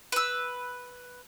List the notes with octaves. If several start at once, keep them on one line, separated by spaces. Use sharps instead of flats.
B4 E6